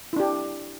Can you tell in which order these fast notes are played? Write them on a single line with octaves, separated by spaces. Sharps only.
E4 D4 G4